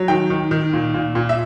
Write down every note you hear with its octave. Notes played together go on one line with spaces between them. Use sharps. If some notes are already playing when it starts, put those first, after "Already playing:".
Already playing: F#3
D#3 G5
D#3
D#3
A#2
A#2
A#2
E5